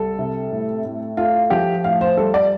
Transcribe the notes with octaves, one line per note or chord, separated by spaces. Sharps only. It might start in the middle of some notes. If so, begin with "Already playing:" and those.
Already playing: C2 G3 A4
C3
A2
A2
A3 F4
F3 G4
A2 F5
C5
G3 A4
D5